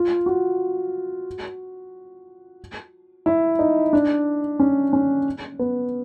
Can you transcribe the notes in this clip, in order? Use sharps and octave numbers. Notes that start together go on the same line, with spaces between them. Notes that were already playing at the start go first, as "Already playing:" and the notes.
Already playing: F4
F#4
E4
D#4
D4
C#4
C#4
B3